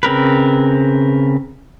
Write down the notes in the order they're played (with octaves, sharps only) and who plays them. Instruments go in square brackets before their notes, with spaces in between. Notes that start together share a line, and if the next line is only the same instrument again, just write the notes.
[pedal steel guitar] C#3 C4 A#4 B4